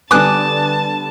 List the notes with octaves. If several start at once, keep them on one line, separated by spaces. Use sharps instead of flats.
D3 G3 B3 G#5 A5 D6 D#6 F#6